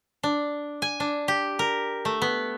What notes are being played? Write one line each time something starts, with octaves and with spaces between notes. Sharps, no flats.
D4
G#5
D4
G4
A#4
A3
B3